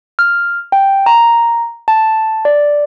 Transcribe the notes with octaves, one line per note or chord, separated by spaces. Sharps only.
F6
G5
A#5
A5
D5